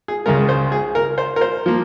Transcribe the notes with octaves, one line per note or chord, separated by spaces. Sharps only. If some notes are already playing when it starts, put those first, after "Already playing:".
G#4
C#2 C#3 G#3 A#4
C5
G#4
A#4
C5
A#4
C5
F3 A#3